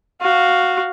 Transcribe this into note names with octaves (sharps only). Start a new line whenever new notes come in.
F#4 F5